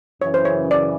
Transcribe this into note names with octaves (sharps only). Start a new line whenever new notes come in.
F#2 C#3 E3 C#5
C5
C#5
D5